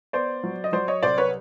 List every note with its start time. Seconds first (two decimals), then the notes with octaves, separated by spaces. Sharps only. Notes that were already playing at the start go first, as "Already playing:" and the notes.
0.13 B3 C5 D5
0.43 F#3
0.64 D#5
0.72 F#3 C5 D5
0.88 C#5 D#5
1.03 C2 C5 D5
1.18 B4 C#5